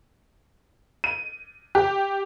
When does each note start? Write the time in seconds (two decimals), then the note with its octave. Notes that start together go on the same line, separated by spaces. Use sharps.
1.04 D#7
1.75 G4